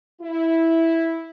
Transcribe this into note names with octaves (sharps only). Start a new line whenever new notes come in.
E4